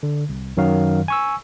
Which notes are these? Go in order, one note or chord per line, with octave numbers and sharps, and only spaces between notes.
D3
C2
F#2 D#3 F#3 F5
G#5 C#6 E6